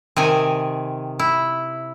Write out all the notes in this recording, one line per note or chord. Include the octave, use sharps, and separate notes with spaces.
C3 D#3 G#5
E4